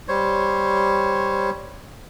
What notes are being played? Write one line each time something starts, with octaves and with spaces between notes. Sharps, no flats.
G3 C5 C#5